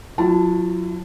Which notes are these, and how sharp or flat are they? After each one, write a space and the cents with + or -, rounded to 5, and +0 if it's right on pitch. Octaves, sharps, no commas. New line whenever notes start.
F#3 -35 E4 +35 A5 +0